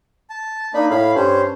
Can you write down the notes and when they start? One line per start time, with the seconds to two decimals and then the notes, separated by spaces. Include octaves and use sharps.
0.30 A5
0.74 A#3 D4 D#4 B5
0.90 A2 F5 B5
1.15 G2 C#4 C5